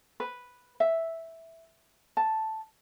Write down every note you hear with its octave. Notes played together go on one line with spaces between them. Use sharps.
B4
E5
A5